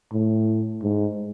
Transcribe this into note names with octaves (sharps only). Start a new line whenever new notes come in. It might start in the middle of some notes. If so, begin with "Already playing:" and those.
A2
G#2